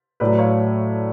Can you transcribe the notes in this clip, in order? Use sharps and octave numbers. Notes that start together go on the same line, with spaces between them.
A2 F#3 B4 D5
C#5 F5